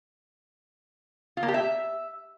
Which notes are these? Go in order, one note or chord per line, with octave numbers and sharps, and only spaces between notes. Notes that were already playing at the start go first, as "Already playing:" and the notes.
F4
A#3
G4
E5